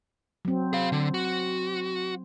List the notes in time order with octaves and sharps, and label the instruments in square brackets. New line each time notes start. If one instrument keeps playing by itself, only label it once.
[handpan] F#3 C4
[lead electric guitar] G#4 F5
D3
F#4